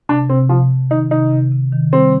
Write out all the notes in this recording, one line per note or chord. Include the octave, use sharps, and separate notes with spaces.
C3 D4
C3 C4
C3 F3
C3
D#3 D#4
C3 D#4
C3
C3
D#3
G3 C4